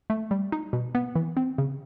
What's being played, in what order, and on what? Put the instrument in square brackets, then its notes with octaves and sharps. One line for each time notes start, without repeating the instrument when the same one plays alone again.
[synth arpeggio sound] A3
G3
D#4
B2
B3
E3
C4
C#3